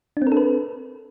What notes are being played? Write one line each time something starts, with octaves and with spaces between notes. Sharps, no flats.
D4
C4
A#4
A4
B4